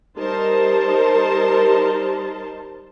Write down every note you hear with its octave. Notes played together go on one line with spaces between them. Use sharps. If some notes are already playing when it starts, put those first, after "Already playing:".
G3 D#4 A#4 C5 A5